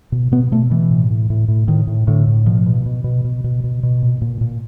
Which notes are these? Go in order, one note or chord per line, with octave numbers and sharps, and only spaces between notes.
B2
B2 B3
B2 A3
B2 E3
A2
A2
A2
A2
A2 D#3
A2
A2 D3
A2
B2 F3
B2
B2
B2
B2
B2
B2
B2
A#2
A#2
A#2